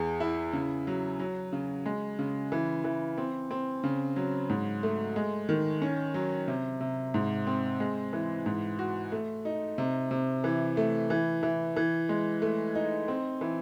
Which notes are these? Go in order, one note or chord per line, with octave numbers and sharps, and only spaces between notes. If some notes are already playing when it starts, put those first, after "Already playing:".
Already playing: E2 G#4
E4
C#3
F#3
F#3
C#3
G#3
C#3
E3
E3
C4
C4
C#3
F#3
G#2
A3
G#3
D#3
C#4
F#3
C3
C3
G#2
C4
G#3
E3
G#2
F#4
A3
D#4
C3
C3
E3
A3
E3
E3
E3
G#3
A3
D#4
C4
E3